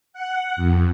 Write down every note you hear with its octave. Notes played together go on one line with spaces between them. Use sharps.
F#5
F2